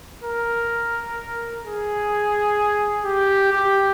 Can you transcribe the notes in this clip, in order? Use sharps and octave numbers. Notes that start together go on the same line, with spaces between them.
A#4
G#4
G4
G4